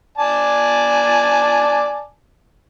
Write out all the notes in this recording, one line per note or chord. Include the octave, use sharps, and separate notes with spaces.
D5 G#5 A5